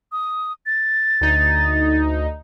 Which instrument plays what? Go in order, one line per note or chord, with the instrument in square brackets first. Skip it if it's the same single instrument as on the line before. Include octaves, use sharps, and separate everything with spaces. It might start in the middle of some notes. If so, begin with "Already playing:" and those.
[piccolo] D#6
A6
[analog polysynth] D2 D#4